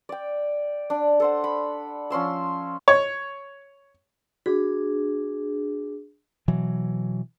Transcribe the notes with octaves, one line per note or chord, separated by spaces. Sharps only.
D5 G5
D4
A4 C5 F#5
B5
F3 C#4 C6 E6
C#5
D4 F#4 G#4
B2 E3 F#3